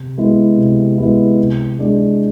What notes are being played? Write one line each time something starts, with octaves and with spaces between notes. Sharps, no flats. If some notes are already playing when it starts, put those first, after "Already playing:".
Already playing: C3
G#3 B3 E4
C3
G#3 B3 E4
C3
G#3 D4 G#4 D5